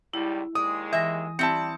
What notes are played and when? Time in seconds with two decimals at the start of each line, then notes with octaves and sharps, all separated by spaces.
0.14 C#2 G3 E4
0.55 D#2 G#3 D5 D#6
0.93 E3 E5 G#5 A#6
1.39 G3 C4 E4 A5 C#7